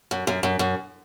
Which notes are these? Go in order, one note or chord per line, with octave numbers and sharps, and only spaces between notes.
F#2
F#2
F#2
F#2